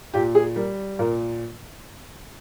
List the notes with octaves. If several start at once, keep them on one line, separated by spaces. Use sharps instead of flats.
A#2 G4
G#4
G3 A#4
A#2 A#4